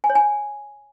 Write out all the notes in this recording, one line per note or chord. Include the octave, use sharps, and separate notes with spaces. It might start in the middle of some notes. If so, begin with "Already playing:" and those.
G#5
C#5
G#5